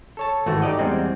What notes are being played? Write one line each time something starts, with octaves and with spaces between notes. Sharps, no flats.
A4 C#5 A5
G#1 E3 A3 F#4
D#4 G4 D5 D#5
E2 G3 G#3 C4